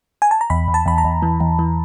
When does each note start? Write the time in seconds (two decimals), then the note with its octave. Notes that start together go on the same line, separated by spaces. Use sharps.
0.22 G#5
0.31 A5
0.41 A#5
0.50 E2 B5
0.68 E2
0.74 A5
0.86 E2 B5
0.98 A#5
1.04 E2
1.22 E3
1.40 E2
1.59 E3